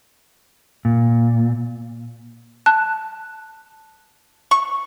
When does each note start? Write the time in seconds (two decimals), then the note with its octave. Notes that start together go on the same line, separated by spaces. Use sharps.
0.85 A#2
2.66 A5 F#6
4.51 C#6